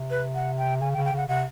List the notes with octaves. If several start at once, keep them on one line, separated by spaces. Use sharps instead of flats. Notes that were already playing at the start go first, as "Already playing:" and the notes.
Already playing: C3
B4
F#5
G5
C#3 G#5
G5
C#3
G5
C#3 F#5
C3 F#5